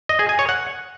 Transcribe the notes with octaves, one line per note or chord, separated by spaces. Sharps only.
D#5
G#4
G#5
C#5
F#5